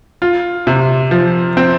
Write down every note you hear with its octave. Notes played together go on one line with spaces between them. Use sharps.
F4
C3
F3
C4